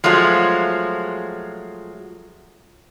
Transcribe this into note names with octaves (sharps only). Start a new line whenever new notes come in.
F3 F#3 G#3 A3 F4